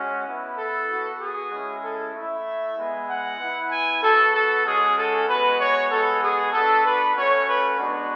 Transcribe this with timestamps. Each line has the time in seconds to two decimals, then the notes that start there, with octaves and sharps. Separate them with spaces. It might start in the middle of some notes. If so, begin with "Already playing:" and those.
Already playing: G#3 C#4 F#4
0.25 B3 E4
0.57 A4
0.89 B3 F#4
1.20 G#4
1.51 G#3 C#4 E4
1.82 A4
2.14 A3 E4 E5
2.76 G#3 B3 E4
3.07 F#5
3.39 B3 E4
3.71 G#5
4.02 B3 F#4 A4
4.33 A4
4.64 G#3 C#4 F#4 G#4
4.96 A4
5.27 G#3 B3 F#4 B4
5.58 C#5
5.90 G#3 B3 F#4 A4
6.21 G#4
6.52 B3 D4 F#4 A4
6.84 B4
7.15 A3 C#4 F#4 C#5
7.47 B4
7.78 G#3 B3 D4 F#4